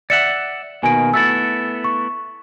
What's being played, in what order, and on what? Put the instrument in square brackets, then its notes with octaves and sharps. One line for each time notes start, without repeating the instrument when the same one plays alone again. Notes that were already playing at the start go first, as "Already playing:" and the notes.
[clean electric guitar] D5 E5 F#5 [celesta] C#7
[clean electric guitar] B2 D#3 A#3 [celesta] G#5 D7
[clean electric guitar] A3 B3 E4 [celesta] E6 A6
[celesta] C#6